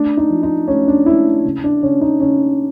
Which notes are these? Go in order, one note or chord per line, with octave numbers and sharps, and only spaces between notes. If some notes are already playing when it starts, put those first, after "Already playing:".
Already playing: A3 D4
D#4
F3
D#4
A3 C#4
D4
A3 E4
C#3
D4
C#3 C#4
D#4
C#3 C#4